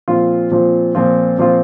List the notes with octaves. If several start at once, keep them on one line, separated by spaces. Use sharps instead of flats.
A#2 F3 C4 F4
A#2 F3 C4 F4
A#2 F3 C4 F4
A#2 F3 C4 F4